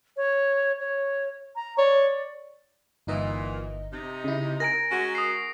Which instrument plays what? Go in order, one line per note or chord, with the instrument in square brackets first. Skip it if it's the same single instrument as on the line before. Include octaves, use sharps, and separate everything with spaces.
[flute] C#5
C#5
A#5
[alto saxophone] C#5 [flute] D5
[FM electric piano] G1 D#4 D#5 [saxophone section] A#2 E3
[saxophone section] C3 D#4
[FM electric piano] C#3 E4
[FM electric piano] A#4 G#5 A#5 [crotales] A#6 D7
[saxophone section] G#3 C#4 F#4
[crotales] D#6 C7